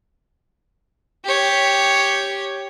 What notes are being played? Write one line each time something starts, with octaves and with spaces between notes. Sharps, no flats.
G4 C#5